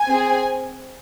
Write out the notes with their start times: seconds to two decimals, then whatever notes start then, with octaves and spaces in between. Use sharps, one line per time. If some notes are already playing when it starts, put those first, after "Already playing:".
Already playing: G#5
0.10 C4 G#4